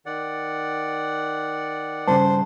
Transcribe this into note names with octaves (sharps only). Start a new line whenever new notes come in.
D#3 D5 F#5
G2 C#3 C5 A5